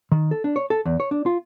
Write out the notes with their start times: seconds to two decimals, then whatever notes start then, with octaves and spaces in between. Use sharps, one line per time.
0.12 D#3
0.31 A4
0.44 D4
0.56 C#5
0.70 A4
0.86 E2
1.00 C#5
1.11 D4
1.26 F4